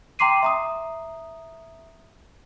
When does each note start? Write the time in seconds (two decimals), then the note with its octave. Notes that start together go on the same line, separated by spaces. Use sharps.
0.19 G5 A#5 C6 D6 C7 D#7
0.43 E5 A#5 D#6